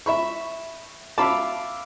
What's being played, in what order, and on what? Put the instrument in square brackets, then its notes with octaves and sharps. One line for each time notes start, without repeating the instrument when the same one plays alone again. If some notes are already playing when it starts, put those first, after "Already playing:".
[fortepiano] E5 B5 C#6
[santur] E5 F5 D6 [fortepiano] A5 B5